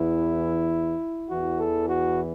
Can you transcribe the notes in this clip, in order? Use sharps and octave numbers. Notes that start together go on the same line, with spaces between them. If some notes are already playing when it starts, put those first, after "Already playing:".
Already playing: E2 E3 E4
E2 E3 F#4
A4
F#4